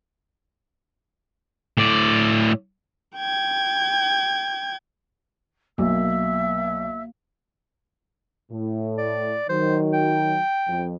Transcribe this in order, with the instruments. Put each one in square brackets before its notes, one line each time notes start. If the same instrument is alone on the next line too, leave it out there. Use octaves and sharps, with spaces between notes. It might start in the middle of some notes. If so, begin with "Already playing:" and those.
[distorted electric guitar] A2 D5
[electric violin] G5 G#6
[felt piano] B1 [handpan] A#3 [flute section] E5 E6
[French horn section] A2
[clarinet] D5
[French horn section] D#3 F#3 [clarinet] C5
[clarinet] G5
[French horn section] F2